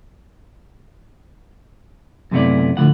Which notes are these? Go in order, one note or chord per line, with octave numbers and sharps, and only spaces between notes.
F#2 C3 A3 B3 E4 D5
D2 A2 D3 F3 F#5